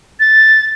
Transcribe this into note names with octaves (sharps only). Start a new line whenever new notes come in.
A6